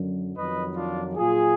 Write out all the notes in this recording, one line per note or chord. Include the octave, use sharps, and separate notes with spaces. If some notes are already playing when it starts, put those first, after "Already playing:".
Already playing: F#2 D3 F#3
F2 D#3 F#3 B4 D#5
D4 F4
A#2 F#3 F4 G#4